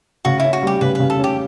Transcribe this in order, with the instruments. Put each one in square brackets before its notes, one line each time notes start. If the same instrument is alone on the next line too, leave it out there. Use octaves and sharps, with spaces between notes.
[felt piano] C#3 [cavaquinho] F#4
[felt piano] C#4 [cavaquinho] E4
[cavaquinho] F#4
[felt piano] G3 [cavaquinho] G4
[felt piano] C#3 [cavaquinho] B4
[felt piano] C#3 [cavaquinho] B4
[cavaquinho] A4
[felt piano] C#4 [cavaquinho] G4